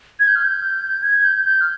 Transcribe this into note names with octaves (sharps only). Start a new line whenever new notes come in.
G#6
G6
F6
G6
G#6
G6
G6
F6